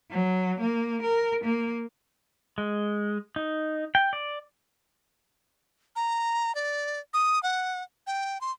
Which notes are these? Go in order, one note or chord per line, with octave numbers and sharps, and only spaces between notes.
F#3
A#3
A#4
A#3
G#3
D#4
G5
D5
A#5
D5
D#6
F#5
G5
C6